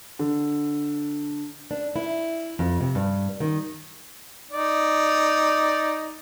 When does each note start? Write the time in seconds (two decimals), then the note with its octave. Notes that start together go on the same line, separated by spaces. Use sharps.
0.19 D3
1.71 D4
1.96 E4
2.59 F2
2.81 C3
2.95 G2
3.40 D#3
4.51 D#4 D5